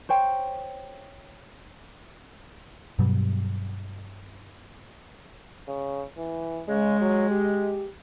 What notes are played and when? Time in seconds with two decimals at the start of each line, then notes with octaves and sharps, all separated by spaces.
0.09 C5 C#5 G5
2.99 G2 B2 F#3 G3
5.68 C#3
6.17 E3
6.69 C#3 G#3
7.01 F#3
7.31 G4